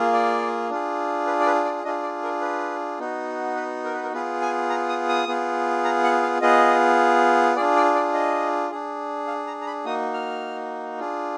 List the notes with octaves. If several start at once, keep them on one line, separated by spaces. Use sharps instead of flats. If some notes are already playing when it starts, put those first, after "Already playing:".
Already playing: A#3 F4 G#4
D5
D4 F4 G#4
B4
D5
B4
D5
D4 F4 G#4 D#5
D5
A#4
B4
B3 D#4 F#4
B4
A#4
B4
A#4
B3 F4 G#4 B4
G#5
A#5
D#6
D#6
B3 F4 G#4
A#5
F#5
F5
B3 F4 G#4 D#5
D4 F4 G#4 D5
D5
D5
D#5
D4 G#4
F5
A#5
A#5
B5
A#3 D#4 F#4 D#6
F6
D4 F4 G#4